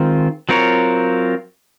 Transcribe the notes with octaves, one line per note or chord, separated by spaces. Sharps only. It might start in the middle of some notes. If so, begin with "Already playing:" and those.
Already playing: D#3 G#3 C4 F4
F#3 C4 F4 A#4 C#5